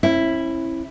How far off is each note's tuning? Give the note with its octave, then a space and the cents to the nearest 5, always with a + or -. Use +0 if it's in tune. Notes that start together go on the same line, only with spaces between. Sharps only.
C#4 -45 E4 +0